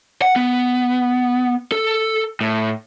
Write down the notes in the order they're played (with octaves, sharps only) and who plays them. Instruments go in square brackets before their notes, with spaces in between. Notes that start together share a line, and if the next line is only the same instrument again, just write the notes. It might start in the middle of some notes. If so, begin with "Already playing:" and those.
[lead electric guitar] F#5
B3
A4
A2